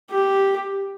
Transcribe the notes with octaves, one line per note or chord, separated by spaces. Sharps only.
G4